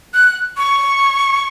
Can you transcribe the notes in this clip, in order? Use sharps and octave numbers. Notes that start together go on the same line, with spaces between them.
F#6
C#6